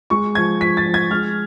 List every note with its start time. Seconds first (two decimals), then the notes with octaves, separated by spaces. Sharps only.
0.10 G#3 C#6
0.35 F3 G#6
0.60 F3 B6
0.77 A6
0.86 F3
0.94 G#6
1.11 G#3 F6